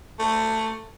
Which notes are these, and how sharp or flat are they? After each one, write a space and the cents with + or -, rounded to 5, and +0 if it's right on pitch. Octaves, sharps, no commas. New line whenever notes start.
A3 +15